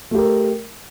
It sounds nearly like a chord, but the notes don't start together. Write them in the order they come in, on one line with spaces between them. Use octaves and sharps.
A3 G4 A#4